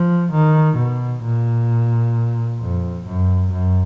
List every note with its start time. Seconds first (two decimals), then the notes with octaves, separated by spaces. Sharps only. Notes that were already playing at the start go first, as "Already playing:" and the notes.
Already playing: F3
0.31 D#3
0.77 B2
1.23 A#2
2.60 F2
3.05 F#2
3.51 F#2